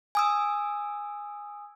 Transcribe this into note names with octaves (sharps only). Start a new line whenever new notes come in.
G#5 D#6 E6